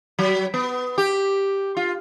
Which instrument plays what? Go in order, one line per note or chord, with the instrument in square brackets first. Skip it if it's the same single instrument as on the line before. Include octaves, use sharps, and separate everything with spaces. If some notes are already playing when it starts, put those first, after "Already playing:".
[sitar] F#3
B3
G4
F4